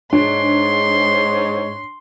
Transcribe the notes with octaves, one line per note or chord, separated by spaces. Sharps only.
G#2 D4 C#5 C6